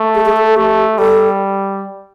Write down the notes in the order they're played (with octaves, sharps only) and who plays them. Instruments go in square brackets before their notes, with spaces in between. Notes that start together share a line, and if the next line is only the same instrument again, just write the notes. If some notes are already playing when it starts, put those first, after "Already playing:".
Already playing: [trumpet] A3
[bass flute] G#4
G#4
A4
A4
[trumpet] A3 [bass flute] G4
[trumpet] G3 [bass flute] A4